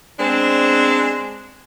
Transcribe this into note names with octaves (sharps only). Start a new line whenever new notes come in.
G#3 B3 C4 D4